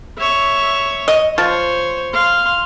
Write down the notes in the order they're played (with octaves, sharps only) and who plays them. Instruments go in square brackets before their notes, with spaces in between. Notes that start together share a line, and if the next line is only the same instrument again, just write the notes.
[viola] C#5 E5
[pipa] D#5
[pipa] F3 [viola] C5 C#5
[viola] F5 C6